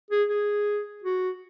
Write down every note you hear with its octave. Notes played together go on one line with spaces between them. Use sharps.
G#4
G#4
F#4